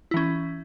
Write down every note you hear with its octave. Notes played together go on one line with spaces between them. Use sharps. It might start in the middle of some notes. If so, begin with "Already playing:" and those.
E3 C#4 E4